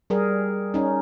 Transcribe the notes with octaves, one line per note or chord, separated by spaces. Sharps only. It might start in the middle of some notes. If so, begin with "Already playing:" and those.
G3 G#4 A#4
C#4 D#4